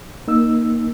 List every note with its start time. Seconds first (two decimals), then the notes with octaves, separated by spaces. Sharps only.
0.28 A#3 D#4 E6